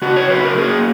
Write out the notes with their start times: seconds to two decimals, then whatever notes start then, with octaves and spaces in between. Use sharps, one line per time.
0.02 C#3 F#4
0.16 C#5
0.30 F#3 B4
0.44 A#4
0.57 A#3 G#4